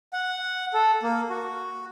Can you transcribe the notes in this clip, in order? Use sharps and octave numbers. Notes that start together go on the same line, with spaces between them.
F#5
A4
A#3
F#4